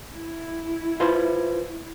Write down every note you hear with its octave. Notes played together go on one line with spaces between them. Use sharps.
E4
F4 B4 C5